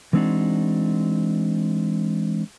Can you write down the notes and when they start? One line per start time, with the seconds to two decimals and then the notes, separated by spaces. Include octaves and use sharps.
0.13 E3 G#3 C4 D4 D#4 F#4